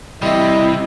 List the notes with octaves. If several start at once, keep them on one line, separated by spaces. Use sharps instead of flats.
C3 E3 G3 E4 D#5